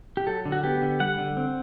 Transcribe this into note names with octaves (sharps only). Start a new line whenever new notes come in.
G4
F#3 A4
D3
F#4
B3 G4
D3
G3 F#5
D3
C4